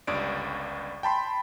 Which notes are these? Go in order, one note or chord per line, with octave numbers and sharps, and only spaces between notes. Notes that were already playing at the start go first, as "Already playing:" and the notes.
G1 C#2 G2 D5 D7
G5 A5 B5 C6